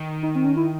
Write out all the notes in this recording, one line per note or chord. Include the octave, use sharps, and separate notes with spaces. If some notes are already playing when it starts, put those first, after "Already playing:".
Already playing: D#3
D#4
C4
C#4
E4